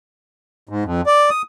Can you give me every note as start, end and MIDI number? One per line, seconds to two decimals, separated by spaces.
0.69 0.84 44
0.85 1.01 41
1.06 1.30 74
1.30 1.42 87